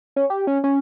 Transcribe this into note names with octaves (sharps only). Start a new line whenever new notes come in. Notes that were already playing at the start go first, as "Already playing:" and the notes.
C#4
G4
C#4
C#4